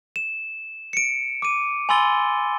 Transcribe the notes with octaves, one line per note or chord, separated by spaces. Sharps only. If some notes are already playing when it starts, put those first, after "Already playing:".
E7
C#7 D7
D6 D#7
G#5 B5 C6 E6 A6 G7